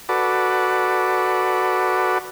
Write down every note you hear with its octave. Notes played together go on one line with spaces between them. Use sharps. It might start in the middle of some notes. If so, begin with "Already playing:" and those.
F#4 A4 B4 D5